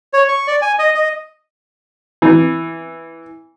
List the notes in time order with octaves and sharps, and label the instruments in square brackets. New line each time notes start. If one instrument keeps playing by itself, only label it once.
[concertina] C#5
C#6
D5
G#5
D#5
D#5
[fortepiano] E3